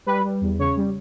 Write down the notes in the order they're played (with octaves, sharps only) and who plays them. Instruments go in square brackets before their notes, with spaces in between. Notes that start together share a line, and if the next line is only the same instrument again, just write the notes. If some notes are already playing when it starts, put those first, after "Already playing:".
[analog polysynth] G3 B4
G3
E2
C#3 C#5
G3